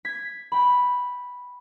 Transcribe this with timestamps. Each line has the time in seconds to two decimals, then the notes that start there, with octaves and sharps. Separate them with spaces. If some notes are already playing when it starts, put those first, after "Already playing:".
0.05 G#6 B6
0.52 G5 B5